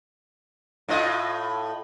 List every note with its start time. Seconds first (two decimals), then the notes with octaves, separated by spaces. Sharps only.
0.88 A2 F4 D#5